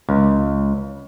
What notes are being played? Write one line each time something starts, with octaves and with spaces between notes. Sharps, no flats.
C#2